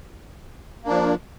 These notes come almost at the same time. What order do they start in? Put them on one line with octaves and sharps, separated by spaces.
A#3 D4 F3